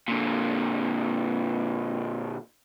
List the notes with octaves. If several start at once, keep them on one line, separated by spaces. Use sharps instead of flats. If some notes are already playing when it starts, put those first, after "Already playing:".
A#2 D3